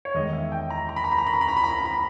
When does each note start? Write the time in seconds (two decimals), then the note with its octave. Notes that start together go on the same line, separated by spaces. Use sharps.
0.05 C#5
0.14 E2 D#3 G#3 D#5
0.33 E5
0.52 G5
0.70 A#5
0.89 A#5
0.96 B5
1.04 A#5
1.12 B5
1.18 A#5
1.27 B5
1.34 A#5
1.41 B5
1.48 A#5
1.57 B5
1.64 A#5
1.71 B5
1.78 A#5
1.86 B5
1.93 A#5